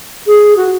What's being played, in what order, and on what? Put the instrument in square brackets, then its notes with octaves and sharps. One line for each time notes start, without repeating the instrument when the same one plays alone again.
[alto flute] G#4
F#4